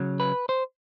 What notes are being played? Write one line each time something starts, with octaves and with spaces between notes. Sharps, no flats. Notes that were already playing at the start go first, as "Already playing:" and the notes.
Already playing: C#3 F#3
B4
C5